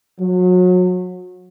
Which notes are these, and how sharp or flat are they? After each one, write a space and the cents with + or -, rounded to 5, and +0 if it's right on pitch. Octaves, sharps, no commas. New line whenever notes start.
F#3 -30